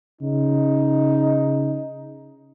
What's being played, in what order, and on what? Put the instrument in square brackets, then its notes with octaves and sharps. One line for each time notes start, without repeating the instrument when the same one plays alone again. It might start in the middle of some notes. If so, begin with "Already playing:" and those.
[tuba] C#3 [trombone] D#4